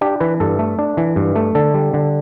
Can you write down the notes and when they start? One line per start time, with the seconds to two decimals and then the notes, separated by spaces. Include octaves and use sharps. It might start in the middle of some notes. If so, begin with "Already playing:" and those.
0.01 D4 G4
0.20 E3 B4
0.40 G2 A4
0.59 A3
0.79 D4
0.97 E3
1.16 G2
1.36 A3
1.55 D3 A4
1.74 G3
1.94 D3